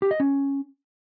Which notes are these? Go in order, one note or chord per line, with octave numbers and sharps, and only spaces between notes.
G4
D#5
C#4